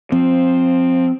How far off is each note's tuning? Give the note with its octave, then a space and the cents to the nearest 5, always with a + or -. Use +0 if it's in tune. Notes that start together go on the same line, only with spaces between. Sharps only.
F3 +10 C4 +0